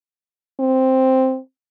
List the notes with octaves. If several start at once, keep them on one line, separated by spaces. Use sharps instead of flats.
C4